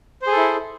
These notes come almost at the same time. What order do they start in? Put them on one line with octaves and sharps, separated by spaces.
C5 G#4 A4 E4